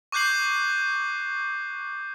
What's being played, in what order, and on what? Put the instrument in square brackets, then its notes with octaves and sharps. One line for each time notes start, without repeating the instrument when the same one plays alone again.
[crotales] C#6 D6 F#6 G6 C7 F#7